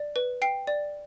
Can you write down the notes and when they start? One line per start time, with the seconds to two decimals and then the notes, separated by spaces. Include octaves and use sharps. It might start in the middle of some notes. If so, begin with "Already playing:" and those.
Already playing: D5
0.16 B4
0.42 G5 C7
0.67 D5